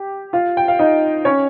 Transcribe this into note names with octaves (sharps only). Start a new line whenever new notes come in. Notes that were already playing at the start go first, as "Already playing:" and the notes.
Already playing: G4
F4 F5
G5
F5
D#4 D#5
C#4 C#5